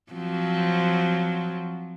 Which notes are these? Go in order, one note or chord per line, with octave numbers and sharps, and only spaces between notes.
F3 F#3 C4